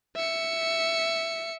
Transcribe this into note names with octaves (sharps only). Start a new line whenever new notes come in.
E5 C#7